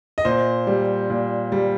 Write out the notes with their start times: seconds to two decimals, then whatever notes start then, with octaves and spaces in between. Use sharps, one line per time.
0.18 D#5
0.25 A#2 C5
0.67 G3
1.10 A#2
1.52 G3